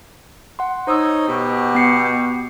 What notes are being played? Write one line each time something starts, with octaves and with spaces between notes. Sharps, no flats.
F#5 C6
D#4 C5 C#5 D#6 E6
B2 G4
B3 C7 C#7